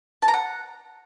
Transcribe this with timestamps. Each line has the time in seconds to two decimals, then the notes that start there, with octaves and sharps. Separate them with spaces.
0.22 A5
0.28 A#5
0.34 F#5